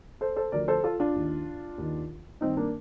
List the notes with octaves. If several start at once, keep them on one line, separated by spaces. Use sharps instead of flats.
A4 C5
A4 C5
D2 D3 F3 A#4 D5
A4 C5
F4 A4
D4 F4
D#2 D#3
D#2 D#3
G2 D#3 C4 D#4
A#3 D4